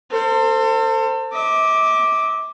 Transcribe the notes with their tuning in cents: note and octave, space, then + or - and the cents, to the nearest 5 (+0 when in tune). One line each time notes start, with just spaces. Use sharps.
A4 +35 C5 +0
E5 -45 D6 +0